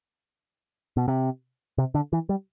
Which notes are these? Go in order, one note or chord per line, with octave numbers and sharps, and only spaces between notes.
B2
C3
C3
D3
E3
G3